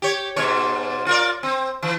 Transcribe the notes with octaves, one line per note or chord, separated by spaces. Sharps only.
G4 C#5
G#2 B2 C#5
F4 A#4 D5
C4
E3